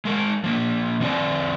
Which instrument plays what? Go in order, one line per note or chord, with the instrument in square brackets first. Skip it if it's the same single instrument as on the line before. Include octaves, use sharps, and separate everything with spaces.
[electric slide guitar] G#3 A#4
F3 A#3
F3 C4 D5